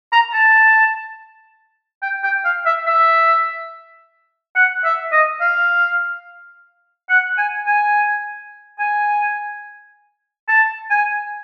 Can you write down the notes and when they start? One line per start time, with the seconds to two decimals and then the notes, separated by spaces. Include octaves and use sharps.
0.12 A#5
0.34 A5
2.02 G5
2.24 G5
2.45 F5
2.66 E5
2.87 E5
4.56 F#5
4.84 E5
5.12 D#5
5.41 F5
7.09 F#5
7.38 G#5
7.66 G#5
8.79 G#5
10.48 A5
10.91 G#5